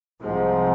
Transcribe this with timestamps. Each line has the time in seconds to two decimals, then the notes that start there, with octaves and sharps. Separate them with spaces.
0.22 C2 G#2 C3 F3